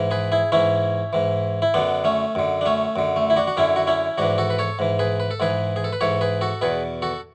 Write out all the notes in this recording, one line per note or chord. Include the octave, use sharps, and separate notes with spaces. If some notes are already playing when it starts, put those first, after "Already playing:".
Already playing: G#2 E3
G#4 B4
E4 G#4
G#2 E3 C#4 E4
G#2 E3
E4
F#2 D3 B3 D4
A3 C#4
F#2 D3
D4
A3 C#4
F#2 D3
A3
E4
D4 F#4
F#4
F#2 D3 C#4 E4
F#4
C#4 E4
G#2 E3 D4 F#4
F#4 A4
B4
A4 C#5
G#2 E3
G#4 B4
B4
A4
G#2 E3 G#4 B4
G#4
A4
B4
G#2 E3 A4 C#5
G#4 B4
F#4 A4
E2 B2 G#4 B4
F#4 A4